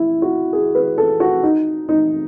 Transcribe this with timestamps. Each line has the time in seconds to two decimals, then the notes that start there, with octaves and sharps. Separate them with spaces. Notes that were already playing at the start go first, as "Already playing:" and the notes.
Already playing: E4
0.22 F#4
0.53 G#4
0.75 B4
0.98 A4
1.20 F#4
1.43 D#4
1.89 D#4